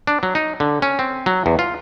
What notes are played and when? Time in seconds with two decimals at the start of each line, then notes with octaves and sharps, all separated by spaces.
0.07 D4
0.23 F#3
0.35 D#4
0.60 D3
0.82 C#4
0.99 C4
1.26 F#3
1.46 E2
1.59 F4